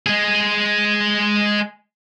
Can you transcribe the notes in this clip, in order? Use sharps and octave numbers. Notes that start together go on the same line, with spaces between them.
G#3 G#4